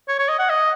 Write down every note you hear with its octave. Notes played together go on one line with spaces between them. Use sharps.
C#5
C#5
D#5
F#5
D#5